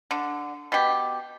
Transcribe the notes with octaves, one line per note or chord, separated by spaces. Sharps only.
D3
B2 G4